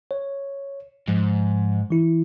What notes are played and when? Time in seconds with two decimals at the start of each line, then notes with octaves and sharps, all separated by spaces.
0.11 C#5
1.08 G#2 F3
1.90 E3 E4